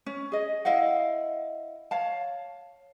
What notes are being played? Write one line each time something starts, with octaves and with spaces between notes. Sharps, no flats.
C#4
G#4 D#5
E4 D#5 F5 F#5
C#5 F5 A5